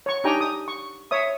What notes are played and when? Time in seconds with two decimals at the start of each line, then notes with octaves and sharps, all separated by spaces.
0.06 C#5 C#6
0.24 D4 D#4 G4 G5 G#5 A#5
0.41 D#6
0.68 C#6
1.11 C#5 E5 D#6